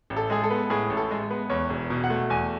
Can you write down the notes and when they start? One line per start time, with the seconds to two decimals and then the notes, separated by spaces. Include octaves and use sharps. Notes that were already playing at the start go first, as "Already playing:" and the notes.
0.10 A1
0.16 A4
0.30 G#3 G#4
0.44 A4
0.50 B3
0.70 A2 G#4
0.90 A1
0.97 A4
1.11 G#3
1.31 B3
1.50 E2 C#5
1.70 E1
1.90 B2
2.04 F#5
2.10 A3
2.30 E2 G#5